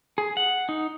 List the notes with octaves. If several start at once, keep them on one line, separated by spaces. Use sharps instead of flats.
G#4
F#5
D#4